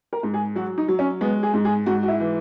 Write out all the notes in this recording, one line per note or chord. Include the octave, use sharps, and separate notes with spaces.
A#4
G#2
G#4
F#3 F#4
D#4
F#3
C#4
G#3 B3
G#4
G#2
G#4
G#2 F#4
F#4
E4
E3